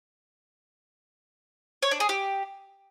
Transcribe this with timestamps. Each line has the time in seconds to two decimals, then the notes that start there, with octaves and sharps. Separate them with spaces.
1.82 C#5
1.91 D4
2.00 G#4
2.09 G4